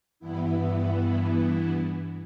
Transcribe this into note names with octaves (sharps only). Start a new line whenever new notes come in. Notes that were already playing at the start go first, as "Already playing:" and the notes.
G2 E3 B3 E4